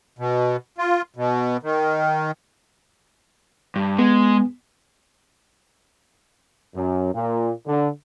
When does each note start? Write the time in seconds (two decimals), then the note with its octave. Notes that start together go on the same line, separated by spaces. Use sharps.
0.19 B2
0.78 F4
1.16 B2
1.63 D#3
3.76 G2
3.98 G#3 B3
6.76 F#2
7.14 A#2
7.67 D3